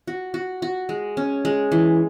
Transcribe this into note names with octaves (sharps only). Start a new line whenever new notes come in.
F#4
F#4
F#4
G#3
C#4
G#3
E3